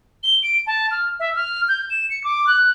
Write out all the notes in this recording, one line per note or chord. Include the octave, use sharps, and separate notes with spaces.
G7
D7
A5
F6
E5
F6
G6
E7
C#7
D6
F#6